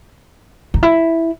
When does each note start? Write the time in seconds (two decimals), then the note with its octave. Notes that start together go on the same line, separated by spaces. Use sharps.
0.74 D#4
0.83 E4